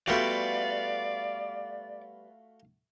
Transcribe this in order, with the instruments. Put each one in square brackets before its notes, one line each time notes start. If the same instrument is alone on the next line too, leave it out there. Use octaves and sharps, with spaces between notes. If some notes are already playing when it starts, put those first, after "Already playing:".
[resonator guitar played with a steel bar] G3 B3 [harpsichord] A3 F4 F#4 [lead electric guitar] D5 [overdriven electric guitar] F5